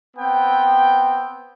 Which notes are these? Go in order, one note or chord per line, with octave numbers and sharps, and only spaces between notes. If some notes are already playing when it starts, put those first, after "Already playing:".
B3 C4 G5